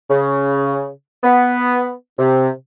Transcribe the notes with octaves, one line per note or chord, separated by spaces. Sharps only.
C#3
B3
C3